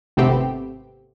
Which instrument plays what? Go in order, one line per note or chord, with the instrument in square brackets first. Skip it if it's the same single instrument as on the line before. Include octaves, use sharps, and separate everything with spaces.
[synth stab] G#1 C3 A3 B3 C4 G4